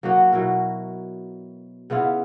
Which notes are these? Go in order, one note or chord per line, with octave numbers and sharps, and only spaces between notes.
F#3 A#3 D#4 F#4
B2 F#3 E4 A#4
C#3 B3 E4 F4